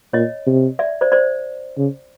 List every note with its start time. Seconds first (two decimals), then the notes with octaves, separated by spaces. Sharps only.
0.13 A#2 C#5 D#5
0.47 C3
0.79 D5 E5
1.01 C5 D5
1.12 C5 D5
1.77 C#3